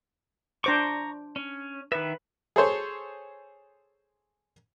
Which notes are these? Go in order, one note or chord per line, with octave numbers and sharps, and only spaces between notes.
D4 C5 A#5 C#6 D6
C#4
D#3 B4 E5
G#4 A4 C5 C#5